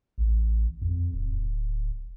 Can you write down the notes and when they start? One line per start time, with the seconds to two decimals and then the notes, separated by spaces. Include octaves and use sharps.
0.18 A1
0.81 F2
1.13 D1